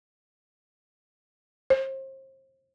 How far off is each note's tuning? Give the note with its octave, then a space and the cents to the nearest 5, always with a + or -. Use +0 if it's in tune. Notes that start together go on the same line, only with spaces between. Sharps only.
C5 +35